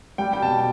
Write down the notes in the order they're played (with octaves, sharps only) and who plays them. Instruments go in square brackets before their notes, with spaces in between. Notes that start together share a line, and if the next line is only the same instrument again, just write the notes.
[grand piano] G3 G5
G5
B2 A5